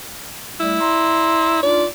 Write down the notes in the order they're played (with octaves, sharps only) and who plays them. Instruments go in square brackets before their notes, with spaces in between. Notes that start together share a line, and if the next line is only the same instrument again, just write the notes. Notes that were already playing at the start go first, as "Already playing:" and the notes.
[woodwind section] G3 A3 [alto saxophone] E4
[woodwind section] D5 A#5 C6
[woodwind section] D4 D#4 F4 [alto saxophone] D5